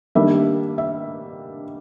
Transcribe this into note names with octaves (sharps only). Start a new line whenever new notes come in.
D#3 G3 A#3 D4 E5
E5